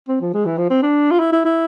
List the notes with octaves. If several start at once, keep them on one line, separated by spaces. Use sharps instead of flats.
C4
F3
G#3
E3
F3
C4
D4
F4
E4
E4
E4